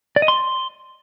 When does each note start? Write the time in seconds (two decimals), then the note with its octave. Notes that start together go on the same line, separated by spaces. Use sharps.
0.16 D5
0.22 D#5
0.28 C6